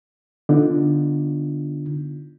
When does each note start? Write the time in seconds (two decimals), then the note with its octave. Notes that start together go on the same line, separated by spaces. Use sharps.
0.49 D3 B3 D4 D#4 F4